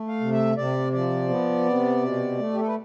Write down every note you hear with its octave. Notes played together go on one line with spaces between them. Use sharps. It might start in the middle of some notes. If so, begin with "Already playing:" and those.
Already playing: A3
F5
C3
E5
C3 D5
F3 D5
B3
C3
B2
A3
G4
A4
B4